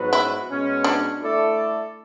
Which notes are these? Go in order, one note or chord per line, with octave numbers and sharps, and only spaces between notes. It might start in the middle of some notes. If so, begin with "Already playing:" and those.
Already playing: G#2 F#3 B3 F#4 B4
E4
B2 G#3 C#4
D4
A3 E4 A4 D5